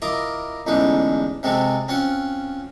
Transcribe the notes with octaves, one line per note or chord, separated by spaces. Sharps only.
E4 F4 A#4 D#5 A#5 D6
A1 E2 D3 G#3 D#4 B4
C3 G#3 C4 F#4 A4
C4 C#4 F4 F#5